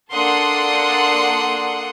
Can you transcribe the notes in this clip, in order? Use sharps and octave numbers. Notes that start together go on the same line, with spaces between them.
A#3 D4 A4 F#5 C6 D#6